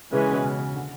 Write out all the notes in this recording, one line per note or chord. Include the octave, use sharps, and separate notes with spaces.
C#3 E3 G#3 C#4 G#4 B4
B2
C#3
C#3
D3